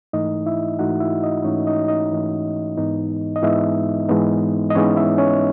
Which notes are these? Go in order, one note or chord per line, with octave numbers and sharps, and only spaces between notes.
G#2 E3 A3 D#4 D#5
E4 E5
G#2 E3 A3 D#4 F#4 F#5
E4 E5
D#4 D#5
G#2 E3 A3 C#4 D#4 C#5
D#4 D#5
D#4 D#5
G#2 E3 A3 D#4
G#2 E3 G#3 B3 D#4
D#5
G#2 E3 G#3 B3 D#4 E4 E5
G#2 E3 G#3 B3 D#4
D#5
G#2 E3 G#3 B3 C#4 D#4 C#5
E4 E5
C#4 C#5